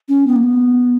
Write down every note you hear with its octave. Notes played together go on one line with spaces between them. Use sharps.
C#4
B3
A#3
B3